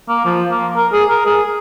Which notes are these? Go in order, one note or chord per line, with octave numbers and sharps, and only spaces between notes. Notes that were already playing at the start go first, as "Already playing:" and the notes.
A#3
F3
A#3
A#4
G#4
A#4
G#4